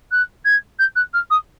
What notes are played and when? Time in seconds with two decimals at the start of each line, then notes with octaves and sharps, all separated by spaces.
0.12 F#6
0.45 G#6
0.79 G6
0.96 F#6
1.14 F6
1.30 D#6